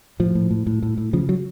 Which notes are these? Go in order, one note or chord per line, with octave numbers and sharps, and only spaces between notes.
A2 F3
A2
A2
A2
A2
A2
C#3 F3
F#3